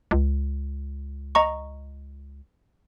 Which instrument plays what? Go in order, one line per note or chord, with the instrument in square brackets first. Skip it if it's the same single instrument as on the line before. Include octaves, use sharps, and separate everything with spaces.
[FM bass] C#2
[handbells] D#5 A#5 C#6